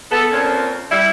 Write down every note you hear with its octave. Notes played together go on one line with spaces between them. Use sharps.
B3 A4
F2 A#2 A#3 C4 C#4
G3 E4